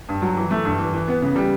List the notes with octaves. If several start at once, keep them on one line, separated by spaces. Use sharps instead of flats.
G2
F#3
E3
A3
G2
E3
E3
B3
C#3
G3